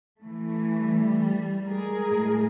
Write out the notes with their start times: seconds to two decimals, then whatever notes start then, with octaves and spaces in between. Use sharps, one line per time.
0.20 E3 A3
0.76 G3
1.68 G#3 G#4 A#4
2.08 A2